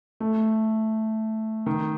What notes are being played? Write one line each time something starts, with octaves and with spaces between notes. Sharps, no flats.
A3
D#3